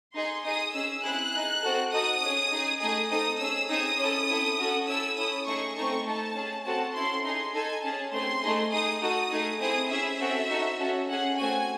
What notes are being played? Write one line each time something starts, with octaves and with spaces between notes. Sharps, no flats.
D#4 G#4 C6
D#4 G#4 D#6
C#4 G#4 E6
C4 E4 G#4 F#6
D#4 G#4
C4 F#4 A4
D#4 F#4 A4 D#6
C#4 G#4
D#4 G#4
A3 D#4 G#4 D#6
C4 D#4 A4 D#6
C#4 G#4 E6
C4 D#4 G#4 D#6
C#4 E4 A4
C4 E4 A4
C#4 F#4 A4
C#4 E4 A4 E6
C#4 E4 A4 D#6
A3 D#4 G#4 C#6
A3 C4 D#4 A4 C#6
A3 D#4 A4 A5
C#4 G#4
C4 F#4 A4 A5
C#4 E4 A4 C6
D#4 G#4 C6
D#4 A4 G#5
C#4 G#4 A5
A3 C4 D#4 G#4 C6
A3 D#4 G#4
D#4 G#4 D#6
D#4 F#4 A4 D#6
A3 D#4 G#4
C4 E4 G#4 D#6
C#4 E4 G#4 E5
C4 F#4 A4
D#4 F#4 A4
C#4 F#4 A4
C#4 G#4 F#5
A3 C4 F#4 G#5